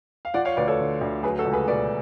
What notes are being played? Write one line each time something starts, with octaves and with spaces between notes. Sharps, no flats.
F5
F3 D5 F#5
C#5 F5
D2 B4 D5
A4 C#5
D3
D2
F#3 G#4 B4
F#4 A4
C#2
G#4 B4
B2 B4 D5